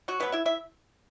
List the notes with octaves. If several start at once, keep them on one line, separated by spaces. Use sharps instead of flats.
F#3 F#4
B2 F#3 A3 B3 B4
E4 E5
E4 E5